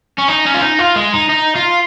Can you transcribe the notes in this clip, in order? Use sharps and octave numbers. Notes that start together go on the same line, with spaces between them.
C#4
D#4
C#4
F4
D#4
F4
G#3
D#4
D#4
F4